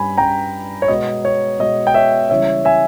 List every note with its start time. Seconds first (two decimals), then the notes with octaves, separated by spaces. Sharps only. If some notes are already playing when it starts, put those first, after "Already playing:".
Already playing: G2 G3 C#4 G#5 B5
0.17 G2 G3 C#4 G5 A#5
0.82 C#5
0.88 B2 G#3 B3 D#5
1.25 C#5
1.59 B2 G#3 B3 D#5
1.87 G5
1.94 C#5 E5
2.30 C#3 E3 G3 C#5 E5
2.65 E5 G#5